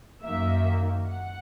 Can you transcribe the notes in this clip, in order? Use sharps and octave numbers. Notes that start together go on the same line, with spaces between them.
F#2 D#3 A#3 E5
F#5